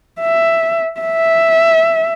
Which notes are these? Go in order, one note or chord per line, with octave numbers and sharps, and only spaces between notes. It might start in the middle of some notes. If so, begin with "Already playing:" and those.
E5
E5